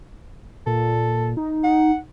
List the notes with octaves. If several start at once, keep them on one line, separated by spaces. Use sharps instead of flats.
A#2 A4
D#4
F#5